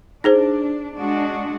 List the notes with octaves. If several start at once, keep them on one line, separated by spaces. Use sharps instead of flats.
D4 D#4 G#4 C5
G#3 D4 F#4